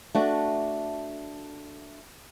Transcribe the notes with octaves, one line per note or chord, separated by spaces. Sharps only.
A3 D4 F#4